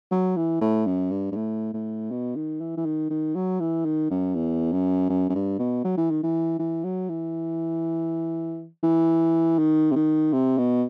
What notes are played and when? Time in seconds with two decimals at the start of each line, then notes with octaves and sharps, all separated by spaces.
0.11 F#3
0.37 E3
0.61 A2
0.86 F#2
1.11 G2
1.32 G2
1.36 A2
1.74 A2
2.11 B2
2.36 D#3
2.61 E3
2.78 E3
2.86 D#3
3.11 D#3
3.35 F#3
3.60 E3
3.85 D#3
4.11 F#2
4.35 E2
4.72 F#2
5.10 F#2
5.30 F#2
5.35 G2
5.59 B2
5.85 F#3
5.97 E3
6.11 D#3
6.23 E3
6.59 E3
6.84 F#3
7.09 E3
8.84 E3
9.59 D#3
9.92 C3
9.96 D#3
10.33 C3
10.58 B2